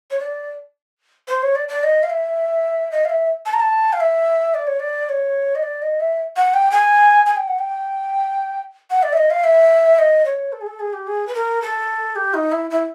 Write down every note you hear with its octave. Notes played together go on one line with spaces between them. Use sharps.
C#5
D5
C5
C#5
D5
D5
D#5
F5
E5
D#5
F5
E5
A5
A#5
A5
F5
E5
D5
C#5
D5
C#5
D#5
D5
D#5
E5
F#5
G5
G#5
G#5
G5
F#5
G5
F#5
D5
E5
D#5
F5
E5
D#5
C#5
A4
G#4
A4
G#4
G4
G#4
B4
A#4
A4
G4
D#4
E4
E4